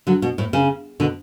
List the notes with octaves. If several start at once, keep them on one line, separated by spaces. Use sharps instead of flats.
D3 F#3
B2
A2
C#3
B2 D3